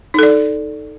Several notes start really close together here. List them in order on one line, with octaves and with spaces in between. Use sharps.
D#4 A4 D5